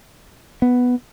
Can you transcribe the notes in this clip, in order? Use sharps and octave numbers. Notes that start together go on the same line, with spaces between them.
B3